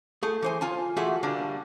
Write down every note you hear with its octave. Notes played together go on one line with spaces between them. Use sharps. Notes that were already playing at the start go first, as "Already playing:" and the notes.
A3 G#4
E3 C5 G#5
F4 G#5 A5
E3 A3 F4 F#4 G#4 E5
D3 G3 A#3 D4